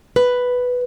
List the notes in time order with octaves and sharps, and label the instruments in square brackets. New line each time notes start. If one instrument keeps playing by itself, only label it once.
[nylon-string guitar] B4